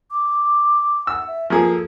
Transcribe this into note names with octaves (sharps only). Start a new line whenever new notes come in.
D6
F#5 E6
E5
F3 A#3 G#4 A4